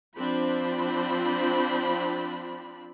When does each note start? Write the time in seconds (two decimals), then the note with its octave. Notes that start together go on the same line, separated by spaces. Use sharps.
0.18 F3 C4 D4 F4 B5